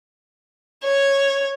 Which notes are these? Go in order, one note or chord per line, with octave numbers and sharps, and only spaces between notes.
C#5